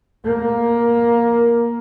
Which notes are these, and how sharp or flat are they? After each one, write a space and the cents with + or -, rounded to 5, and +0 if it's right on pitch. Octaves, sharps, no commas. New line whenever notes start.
A#3 +10